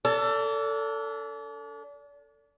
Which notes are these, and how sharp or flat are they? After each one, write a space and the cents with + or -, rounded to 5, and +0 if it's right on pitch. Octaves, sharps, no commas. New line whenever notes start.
D4 -35 A4 +20